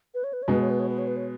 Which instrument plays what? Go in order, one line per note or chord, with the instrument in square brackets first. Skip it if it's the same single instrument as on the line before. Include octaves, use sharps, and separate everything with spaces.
[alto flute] B4
C#5
B4
C#5
[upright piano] B2 G#3 B3 [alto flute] B4
[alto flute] C#5
B4
C#5
B4
C#5
B4
C#5